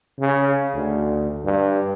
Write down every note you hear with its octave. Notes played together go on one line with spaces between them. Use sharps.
C#3
D2
G2